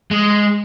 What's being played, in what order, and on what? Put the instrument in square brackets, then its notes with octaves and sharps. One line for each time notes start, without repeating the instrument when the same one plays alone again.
[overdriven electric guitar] G#3